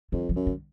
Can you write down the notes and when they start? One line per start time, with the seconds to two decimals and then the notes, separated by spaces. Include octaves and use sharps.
0.12 F2 D3
0.29 F3
0.36 F#2
0.47 D3